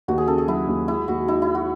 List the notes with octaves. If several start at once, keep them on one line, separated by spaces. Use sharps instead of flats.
D#2 F#4
G#4
C#3 A4
G#4
F#3 E4
D#2
G#3 E4
D#2 F#4
D#4 E4
E4
D#4
F#4